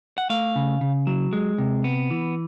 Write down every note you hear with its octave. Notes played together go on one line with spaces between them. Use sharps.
F#5
A3 F5
C#3
C#3
F#3
G#3
C3
B3
E3